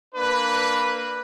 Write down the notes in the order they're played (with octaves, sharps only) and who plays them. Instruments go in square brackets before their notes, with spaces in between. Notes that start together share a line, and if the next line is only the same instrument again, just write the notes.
[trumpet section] A#3 D4 B4